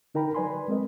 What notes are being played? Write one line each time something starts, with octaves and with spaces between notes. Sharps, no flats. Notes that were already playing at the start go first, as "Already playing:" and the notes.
D3 D#4 A#4 G5 A#5 B5
F#3 B4 D5 G#5 B5 C6
G#3 C4 A#4 D#5